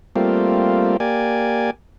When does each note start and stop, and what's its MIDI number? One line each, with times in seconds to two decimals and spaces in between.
0.16 0.97 55
0.16 0.97 57
0.16 0.97 58
0.16 0.97 60
0.16 0.97 65
1.00 1.71 58
1.00 1.71 67
1.00 1.71 74
1.00 1.71 80